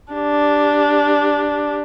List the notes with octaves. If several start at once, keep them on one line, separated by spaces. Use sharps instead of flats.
D4 G4